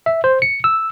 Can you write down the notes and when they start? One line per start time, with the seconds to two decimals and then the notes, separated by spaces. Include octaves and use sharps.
0.06 E5
0.24 C5
0.42 C#7
0.64 E6